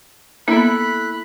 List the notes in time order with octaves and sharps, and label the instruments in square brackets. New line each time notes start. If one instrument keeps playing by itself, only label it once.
[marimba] A#3 B3 [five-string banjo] E4 A4 [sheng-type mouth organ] B5 F#6